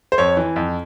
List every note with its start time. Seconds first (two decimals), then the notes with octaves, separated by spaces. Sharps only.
0.12 C5
0.18 F2 C#5
0.37 E3
0.56 F2